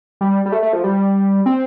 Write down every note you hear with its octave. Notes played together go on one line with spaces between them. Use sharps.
G3
G3
A3
A3
F3
G3
C4